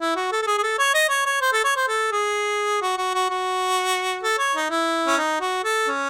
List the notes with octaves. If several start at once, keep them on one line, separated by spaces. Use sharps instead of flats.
E4
F#4
A4
A4
G#4
G#4
A4
C#5
D#5
C#5
C#5
C5
A4
C#5
C5
A4
G#4
F#4
F#4
F#4
F#4
A4
C#5
D#4
E4
C#4
D#4
F#4
A4
C#4